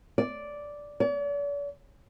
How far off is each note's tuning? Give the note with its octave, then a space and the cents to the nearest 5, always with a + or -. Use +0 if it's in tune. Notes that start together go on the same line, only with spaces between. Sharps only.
D5 -5
D5 -45